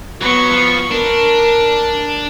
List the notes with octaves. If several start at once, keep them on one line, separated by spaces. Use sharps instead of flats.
F#3 B3 C#6
F3
D4 A#4